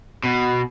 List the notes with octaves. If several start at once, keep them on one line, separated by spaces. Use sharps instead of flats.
B2